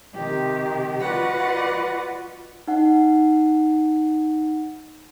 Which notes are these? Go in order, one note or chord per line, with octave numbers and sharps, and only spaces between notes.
C3 D#3 G4
F4 F#4 B4 D5 D#5 F#5
D#4 F#5